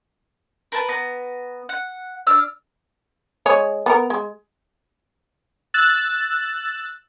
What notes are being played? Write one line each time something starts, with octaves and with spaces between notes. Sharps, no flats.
A#4 B4 A5
B3 A#5
F#5
D4 E6 F6
G#3 G#4 C#5
B3 A4 A#4
G#3
E6 F#6 A6